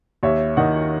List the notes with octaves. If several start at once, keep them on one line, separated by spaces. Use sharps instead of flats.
D#2 C#5 E5
D#3 D#5 F#5